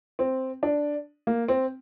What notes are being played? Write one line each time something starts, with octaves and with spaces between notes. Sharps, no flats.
C4
D4
A#3
C4